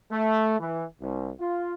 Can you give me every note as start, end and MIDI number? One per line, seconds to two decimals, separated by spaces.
0.12 0.59 57
0.60 0.85 52
1.01 1.31 36
1.39 1.74 65